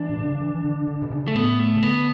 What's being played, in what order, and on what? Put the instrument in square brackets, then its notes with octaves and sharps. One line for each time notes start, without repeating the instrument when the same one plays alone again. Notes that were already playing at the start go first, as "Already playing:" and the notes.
Already playing: [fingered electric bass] E3 [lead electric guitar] D4
[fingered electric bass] A2
B2
C#3
D3
E3
E3
D3
D3
B2
C#3
[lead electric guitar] A3
[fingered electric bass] A2 [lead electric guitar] B3
[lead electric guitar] A3
[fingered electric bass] C#3
[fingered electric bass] D3 [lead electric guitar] B3